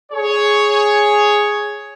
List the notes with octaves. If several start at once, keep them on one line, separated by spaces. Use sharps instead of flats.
G#4 C#5